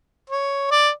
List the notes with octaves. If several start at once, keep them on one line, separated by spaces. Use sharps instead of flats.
C#5
D5